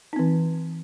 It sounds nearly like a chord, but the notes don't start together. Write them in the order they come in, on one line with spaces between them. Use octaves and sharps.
D#4 C4 E3